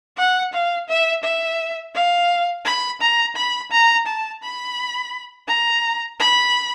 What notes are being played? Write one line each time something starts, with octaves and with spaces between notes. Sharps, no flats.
F#5
F5
E5
E5
F5
B5
A#5
B5
A#5
A5
B5
A#5
B5